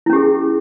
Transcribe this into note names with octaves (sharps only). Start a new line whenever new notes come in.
C#4 E4 G4 G#4